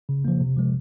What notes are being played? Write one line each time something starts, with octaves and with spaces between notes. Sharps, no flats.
C#3
F3 A#3
C3
F3 G#3